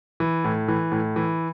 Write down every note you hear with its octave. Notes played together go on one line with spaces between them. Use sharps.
E3
A2
E3
A2
E3